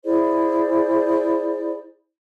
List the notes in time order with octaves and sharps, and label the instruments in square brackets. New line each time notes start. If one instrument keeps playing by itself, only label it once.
[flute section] E4 G#4 C5 D5